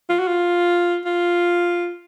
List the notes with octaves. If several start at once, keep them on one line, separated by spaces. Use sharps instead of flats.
F4
F#4
F4
F4